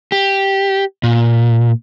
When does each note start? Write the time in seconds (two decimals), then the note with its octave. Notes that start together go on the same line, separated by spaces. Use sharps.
0.12 G4
1.03 A#2